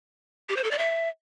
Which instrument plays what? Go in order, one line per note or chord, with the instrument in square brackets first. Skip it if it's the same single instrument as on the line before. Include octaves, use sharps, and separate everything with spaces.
[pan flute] G4
C5
A4
D5
E5